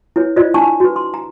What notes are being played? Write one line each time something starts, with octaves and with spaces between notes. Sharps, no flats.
E4 B4 C#5
E4 F4 C5 D5 D#5
D4 E4 A5 C#6
F#4 B4
C6
A#5